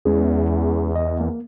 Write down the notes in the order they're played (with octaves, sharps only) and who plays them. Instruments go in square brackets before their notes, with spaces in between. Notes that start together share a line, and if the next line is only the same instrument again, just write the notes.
[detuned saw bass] E2 [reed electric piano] G#3 C#4 G#4
[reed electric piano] D#5
A#3